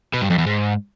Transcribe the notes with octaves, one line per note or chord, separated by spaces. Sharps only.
B2
G2
F2
E2
G#2